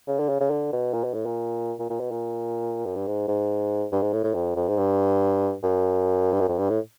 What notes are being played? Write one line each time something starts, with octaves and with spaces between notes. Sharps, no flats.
C#3
D3
C#3
C#3
D3
B2
A#2
B2
A2
A#2
A#2
A#2
B2
A#2
F#2
G2
G#2
G#2
G2
G#2
A2
A2
F2
F2
G#2
G2
F#2
G2
F#2
F2
G2
A2